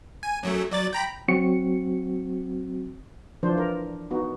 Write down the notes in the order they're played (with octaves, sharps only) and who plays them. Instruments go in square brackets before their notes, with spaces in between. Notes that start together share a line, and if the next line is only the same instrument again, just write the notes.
[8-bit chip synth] G#5
F#2 F#3 A3
F#3 D5 A6
G5 A#5 B5
[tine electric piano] F#3 C4 F#4 C#7
[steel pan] E3 F3 D4 C5
A#4
B3 D#4 F#4